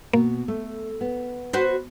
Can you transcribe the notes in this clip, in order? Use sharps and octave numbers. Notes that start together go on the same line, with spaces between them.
B2 A#3
A3
B3
F#4 B4 C5